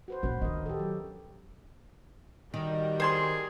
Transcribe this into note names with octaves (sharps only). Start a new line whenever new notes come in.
F#4 B4 C5
A#1 C#4 F#4 B4
D#3 D4 A#4 D#5
G4 A4
F#3
D#3 G3 F#4 A#4
G#4 C5 G#5 C6